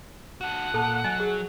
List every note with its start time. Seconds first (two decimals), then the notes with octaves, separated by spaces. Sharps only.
0.41 F#4 A4 F#5
0.74 A#2 A4 A5
1.04 F#3 D#5 G#5
1.20 G#4